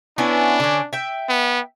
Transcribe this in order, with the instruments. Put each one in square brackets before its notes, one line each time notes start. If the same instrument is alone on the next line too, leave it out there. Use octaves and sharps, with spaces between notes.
[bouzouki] B3 C#4 E4 [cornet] D4
[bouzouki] D3 C#4
E5 G5
[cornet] B3